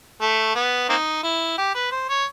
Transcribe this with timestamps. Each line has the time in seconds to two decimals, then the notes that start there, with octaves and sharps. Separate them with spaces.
0.21 A3
0.55 B3
0.89 A#3 C4 D#4
1.23 E4
1.58 G4
1.74 B4
1.91 C5
2.09 C#5